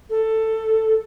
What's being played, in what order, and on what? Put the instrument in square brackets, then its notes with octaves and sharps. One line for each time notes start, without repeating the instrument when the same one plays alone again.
[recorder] A4